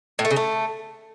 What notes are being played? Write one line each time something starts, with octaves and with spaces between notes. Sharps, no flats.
A2
A3
C#3
A3